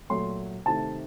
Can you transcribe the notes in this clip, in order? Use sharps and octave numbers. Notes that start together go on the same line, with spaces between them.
A#2 F#3 A3 C6
C3 D#3 A3 A5